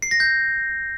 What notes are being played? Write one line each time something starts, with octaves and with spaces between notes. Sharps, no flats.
C7
A#6
G6